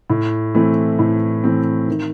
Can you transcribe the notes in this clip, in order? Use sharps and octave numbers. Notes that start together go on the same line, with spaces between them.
A2
E3 A3 C4
A2
E3 A3 C4
D#3